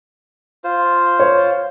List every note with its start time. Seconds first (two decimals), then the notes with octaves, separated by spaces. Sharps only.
0.64 F4 C5
1.20 C#5